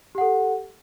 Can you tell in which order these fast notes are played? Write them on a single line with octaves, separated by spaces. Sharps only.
G4 F#5 A4